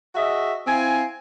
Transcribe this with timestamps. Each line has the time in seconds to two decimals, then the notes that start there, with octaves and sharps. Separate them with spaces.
0.15 F#4 G#4 D#5 E5
0.67 C4 E4 F5 G#5